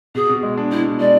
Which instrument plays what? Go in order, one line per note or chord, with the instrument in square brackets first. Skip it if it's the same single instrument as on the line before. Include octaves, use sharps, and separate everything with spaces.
[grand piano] B2 [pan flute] G#4
[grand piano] B2
G#3
D4
[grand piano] B2 [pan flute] E4
[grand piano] B2
[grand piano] G#3 [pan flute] D5